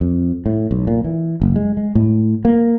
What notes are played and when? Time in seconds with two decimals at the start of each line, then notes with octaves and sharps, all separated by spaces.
0.01 F2
0.46 A2
0.71 B1
0.87 A#2
1.04 E3
1.42 F#1
1.56 G#3
1.77 G#3
1.95 A2
2.45 A#3